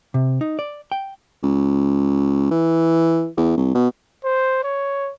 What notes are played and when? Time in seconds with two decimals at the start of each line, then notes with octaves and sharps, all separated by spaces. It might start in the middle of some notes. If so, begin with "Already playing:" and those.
0.14 C3
0.41 D#4
0.59 D5
0.92 G5
1.43 C#2
2.51 E3
3.37 E2
3.58 C2
3.75 B2
4.24 C5
4.64 C#5